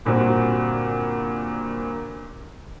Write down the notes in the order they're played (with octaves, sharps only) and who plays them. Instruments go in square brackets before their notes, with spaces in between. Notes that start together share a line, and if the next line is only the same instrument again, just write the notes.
[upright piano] G2 A#2 D3 C4 F#4